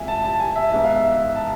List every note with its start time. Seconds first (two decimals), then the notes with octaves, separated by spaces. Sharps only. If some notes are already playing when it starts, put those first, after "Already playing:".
Already playing: E2 C3 G#3 F4 E5 G#5
0.08 A5
0.24 A5
0.40 G#5
0.56 E5
0.71 G#2 G#3 B3 E5
0.84 F5
0.96 E5
1.36 A5